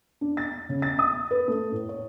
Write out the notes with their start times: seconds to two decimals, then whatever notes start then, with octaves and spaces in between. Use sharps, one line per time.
0.21 D4
0.37 A6
0.69 C#3
0.82 A6
0.99 D#6
1.31 B4
1.48 A3
1.72 A2
1.89 C#5